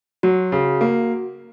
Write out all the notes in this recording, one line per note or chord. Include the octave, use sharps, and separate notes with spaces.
F#3 F#4
C#3
A#3